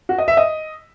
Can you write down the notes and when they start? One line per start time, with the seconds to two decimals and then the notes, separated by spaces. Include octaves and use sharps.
0.09 F#4
0.18 D#5
0.28 E5
0.37 D#5